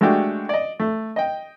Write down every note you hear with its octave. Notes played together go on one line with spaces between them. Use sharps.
G#3 A3 D4 F#4 G4
D5 D#5
A3
D#5 G5